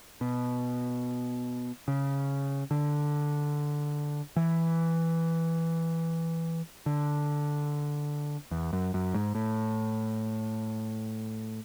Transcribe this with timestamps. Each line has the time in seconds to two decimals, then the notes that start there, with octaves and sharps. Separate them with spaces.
0.21 B2
1.88 C#3
2.71 D3
4.36 E3
6.86 D3
8.51 E2
8.73 F#2
8.94 F#2
9.14 G#2
9.35 A2